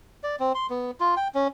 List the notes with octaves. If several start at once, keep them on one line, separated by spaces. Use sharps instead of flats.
D5
C4
C6
B3
F4
G5
C#4